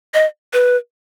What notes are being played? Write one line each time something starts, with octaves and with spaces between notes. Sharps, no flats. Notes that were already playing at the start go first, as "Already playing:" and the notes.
D#5
B4